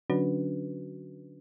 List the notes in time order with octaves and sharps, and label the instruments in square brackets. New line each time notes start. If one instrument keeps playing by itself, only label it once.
[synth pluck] D3 F#3 C#4 D4 F#4 B4